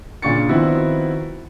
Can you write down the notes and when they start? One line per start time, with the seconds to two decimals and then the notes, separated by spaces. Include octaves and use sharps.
0.22 A#2 C#3 D4 C#6 A6 C#7
0.49 D#3 F3 B3 C4 E4 F#4